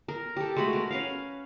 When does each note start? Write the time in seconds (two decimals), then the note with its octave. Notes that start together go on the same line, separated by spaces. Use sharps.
0.08 A#4
0.36 G4 A4
0.57 G#3 A3 F#4 B5
0.73 A#4 B4
0.91 C#4 B4 F5